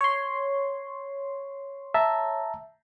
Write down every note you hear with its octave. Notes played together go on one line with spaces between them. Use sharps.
C#5 C6
E5 A5 A#5